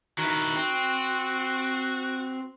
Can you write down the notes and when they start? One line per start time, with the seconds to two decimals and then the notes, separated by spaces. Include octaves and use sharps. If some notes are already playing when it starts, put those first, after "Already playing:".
0.18 D#3 E4 F#4
0.56 C4